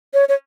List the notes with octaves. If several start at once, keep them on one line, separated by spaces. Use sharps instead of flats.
C#5
C#5